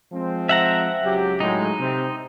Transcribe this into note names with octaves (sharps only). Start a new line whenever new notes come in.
F3 G#3 C4
E5 F#5 A#5
C#2 F#3 G4
A2 F#3 G#3 D#4
C3 C4